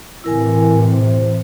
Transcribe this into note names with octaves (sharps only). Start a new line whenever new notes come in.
A2 C3 E3 E4 A#4 G#5
C5